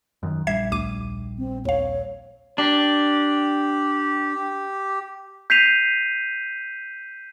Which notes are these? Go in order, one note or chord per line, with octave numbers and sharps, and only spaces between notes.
F#2 D#3
A#1 G3 E5 G#6 C7
D2 D6 D#7
C4
D#2 C#5 F5
D4 G4
G6 B6 C7 D#7 F7